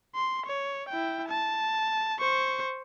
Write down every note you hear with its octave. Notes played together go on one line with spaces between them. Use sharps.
C6
C#5
E4 G5
A5
C5 C#6